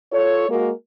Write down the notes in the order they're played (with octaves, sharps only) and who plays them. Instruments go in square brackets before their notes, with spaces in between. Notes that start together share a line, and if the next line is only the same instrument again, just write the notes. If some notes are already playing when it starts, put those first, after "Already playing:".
[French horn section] F4 A4 C#5
G#3 A#3 F#4 A#4